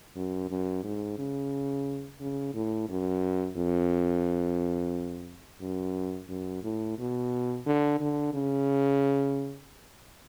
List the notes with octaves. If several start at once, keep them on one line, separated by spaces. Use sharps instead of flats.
F#2
F#2
G#2
C#3
C#3
A2
F#2
F2
F#2
F#2
A2
B2
D3
D3
C#3